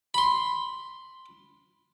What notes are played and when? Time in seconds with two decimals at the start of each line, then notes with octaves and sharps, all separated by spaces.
0.14 B5 C6